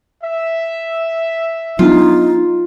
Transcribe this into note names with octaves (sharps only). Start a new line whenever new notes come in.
E5
F#3 B3 D4 D#4 F4